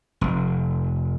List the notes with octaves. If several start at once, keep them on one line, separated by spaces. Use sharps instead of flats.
F1